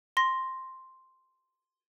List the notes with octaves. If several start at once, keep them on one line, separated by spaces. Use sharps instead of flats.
C6 A#6